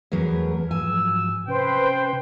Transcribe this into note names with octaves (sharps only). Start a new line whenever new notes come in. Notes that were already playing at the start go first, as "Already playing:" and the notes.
E2 F#3 A3 G#4 A#4 B4
G#2 F3 F#3 G#5 E6
C3 C#4 B4 C5 G5